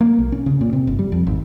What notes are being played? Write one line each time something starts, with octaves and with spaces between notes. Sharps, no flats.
A#3
B1
C#4
C#3
A#2
C3
G1
G3
F2
G#1